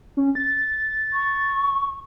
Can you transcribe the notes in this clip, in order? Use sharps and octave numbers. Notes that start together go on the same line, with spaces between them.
C#4
A6
C#6